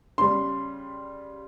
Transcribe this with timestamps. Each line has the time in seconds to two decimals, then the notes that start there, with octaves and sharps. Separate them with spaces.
0.18 C#3 G3 C6